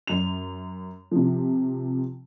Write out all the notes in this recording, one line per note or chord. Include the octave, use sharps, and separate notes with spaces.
F#2 F7
C3 F3